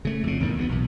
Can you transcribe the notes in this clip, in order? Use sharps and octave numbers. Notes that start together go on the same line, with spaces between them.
C#3 A3
F2 C#3
A1 E2 G#2 D#3
D2 G2 B3
B1 E2